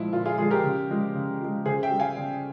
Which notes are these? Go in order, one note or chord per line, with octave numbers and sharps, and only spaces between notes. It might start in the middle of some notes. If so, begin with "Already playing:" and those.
Already playing: A#2 F3 G#3 E4
A#2 F4
F4 G#4
F3 G#3 F4 G#4
G4 A#4
C#3
F3 G#3
C#3
F3 G#3
C#3 G#4 C5
E5 G5
G3
F5 G#5
C#3